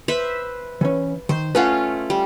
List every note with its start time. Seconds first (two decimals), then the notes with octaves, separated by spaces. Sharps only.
0.08 B4 C5 E5
0.81 E3 C#4
1.29 D#3 C5
1.55 A3 C#4 F4 B4 F5 F#5
2.10 G3